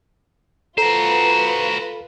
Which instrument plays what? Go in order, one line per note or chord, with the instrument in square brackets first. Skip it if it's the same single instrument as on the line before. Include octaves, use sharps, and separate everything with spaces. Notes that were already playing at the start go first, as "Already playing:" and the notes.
[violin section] F4 B4 [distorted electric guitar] F#4 C5 [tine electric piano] A4 [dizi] A#5